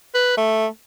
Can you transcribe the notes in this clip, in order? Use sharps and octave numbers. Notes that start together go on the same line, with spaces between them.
B4
A3